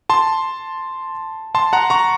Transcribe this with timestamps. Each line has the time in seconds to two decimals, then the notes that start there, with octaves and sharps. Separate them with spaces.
0.09 A5 C6
1.55 A5 C6
1.73 F#5 A#5
1.90 A#5 C#6